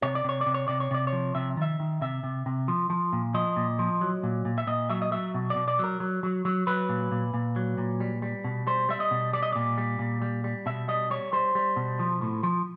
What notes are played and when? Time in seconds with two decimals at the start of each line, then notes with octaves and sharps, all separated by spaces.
0.02 C3 C#5
0.15 D5
0.24 C3 C#5
0.41 D5
0.46 C3
0.54 C#5
0.68 C3 D5
0.80 C#5
0.91 C3 D5
1.07 C#5
1.13 F3
1.35 C3 E5
1.57 D#3 E5
1.80 D#3
2.02 C3 E5
2.24 C3
2.46 C3
2.68 F3
2.90 F3
3.13 A#2
3.34 F3 D#5
3.57 A#2
3.79 F3
4.01 F#3
4.23 A#2
4.45 A#2
4.58 E5
4.67 A#2 D#5
4.90 F#3 E5
5.02 D#5
5.12 F#3 E5
5.34 B2
5.50 D5
5.56 B2
5.68 D5
5.79 F#3 A#4
6.00 F#3
6.23 F#3
6.45 F#3
6.67 F#3 B4
6.89 A#2
7.12 A#2
7.34 A#2
7.56 F#3
7.78 A#2
8.00 G3
8.22 G3
8.44 B2
8.67 G3 C5
8.89 G3 E5
9.00 D#5
9.11 B2
9.33 G3 D5
9.43 D#5
9.52 A#2 D5
9.78 G3
9.99 A#2
10.22 G3
10.44 G3
10.66 B2 E5
10.88 G3 D#5
11.10 G3 C#5
11.33 G3 C5
11.55 G3
11.76 B2
11.99 F3
12.21 A2
12.43 F3